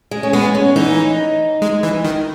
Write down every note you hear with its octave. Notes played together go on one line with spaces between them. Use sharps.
G#3
C#4
G#3 B3
C#4
E3 D#4
G#3
E3
D#3